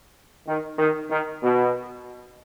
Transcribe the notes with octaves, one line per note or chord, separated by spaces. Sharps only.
D#3
D#3
D#3
B2